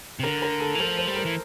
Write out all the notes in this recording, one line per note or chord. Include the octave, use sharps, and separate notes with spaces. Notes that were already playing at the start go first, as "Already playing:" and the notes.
C3
D3 A#4
A#4
A4
E3
F3 A#4
C5
G3
A#4
E3